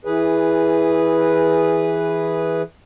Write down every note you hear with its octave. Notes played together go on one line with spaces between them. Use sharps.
E3 G#4 B4